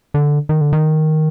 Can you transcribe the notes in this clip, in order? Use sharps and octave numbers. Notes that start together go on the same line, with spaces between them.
D3
D#3
D3
D#3